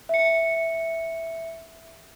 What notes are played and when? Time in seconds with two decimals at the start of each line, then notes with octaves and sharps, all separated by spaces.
0.09 E5 C#7